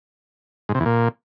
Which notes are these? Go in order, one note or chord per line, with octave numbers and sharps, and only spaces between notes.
G#2
C3
E2
A#2